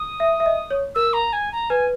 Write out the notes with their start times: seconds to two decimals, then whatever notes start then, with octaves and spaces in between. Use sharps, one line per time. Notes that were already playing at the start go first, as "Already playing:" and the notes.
Already playing: D#6
0.20 E5
0.40 E5
0.46 D#5
0.71 C#5
0.95 A#4 E6
1.13 A#5
1.33 G#5
1.52 A#5
1.70 B4 G#5